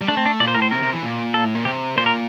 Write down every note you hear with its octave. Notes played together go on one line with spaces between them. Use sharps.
G3
A3 D4
C4
D4
A#2 D5
C5
A2 A#4
C5
C3 A#4
C3
E3
A#2
A4
A2
A#2
C3 G4
A#2 C5
A#4